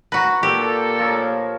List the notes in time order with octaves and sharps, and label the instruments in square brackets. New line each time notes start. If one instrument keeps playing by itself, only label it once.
[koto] F#4 B4 [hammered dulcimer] A#5
[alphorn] A#2 [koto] G4 [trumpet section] A4
[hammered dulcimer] F3 A#4 C#5